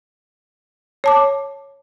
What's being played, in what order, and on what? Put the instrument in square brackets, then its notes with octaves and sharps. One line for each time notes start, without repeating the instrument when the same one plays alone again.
[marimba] C#5 A5 D6